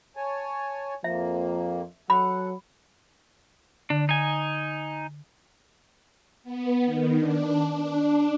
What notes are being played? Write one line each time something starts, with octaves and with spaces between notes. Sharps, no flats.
C#5 G#5 A5
F2 F3 A#3 E5
F#3 A4 F#5 B5
D3 D4
D#4 G#5
B3
D#3
D4
D4